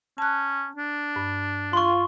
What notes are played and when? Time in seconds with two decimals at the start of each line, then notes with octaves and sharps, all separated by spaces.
0.18 C#4 A5 F#6
0.77 D4
1.16 G2
1.73 F4 C6 C#6